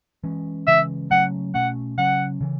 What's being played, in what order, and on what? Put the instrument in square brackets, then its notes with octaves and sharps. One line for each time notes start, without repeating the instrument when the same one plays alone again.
[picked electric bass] E3 G#3 C#4
[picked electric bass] C#3 E3 G#3 C#4 [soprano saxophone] E5
[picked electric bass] C#3 F#3 A3 C#4 [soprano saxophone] F#5
[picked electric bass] B2 A3 C#4 [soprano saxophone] F#5
[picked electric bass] C#3 F#3 C#4 [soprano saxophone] F#5
[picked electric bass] C#3 E3